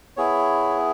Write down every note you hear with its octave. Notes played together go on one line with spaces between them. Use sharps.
B3 E4 G#4 C#5